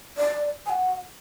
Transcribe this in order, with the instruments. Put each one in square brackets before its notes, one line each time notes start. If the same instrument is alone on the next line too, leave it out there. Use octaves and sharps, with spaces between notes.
[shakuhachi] D5
G#5
F#5